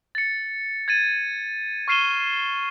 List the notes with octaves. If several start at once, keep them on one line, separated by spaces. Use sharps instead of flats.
A6 C#7
G#6 A6 D#7
C#6 F6 C7 D#7 E7 G7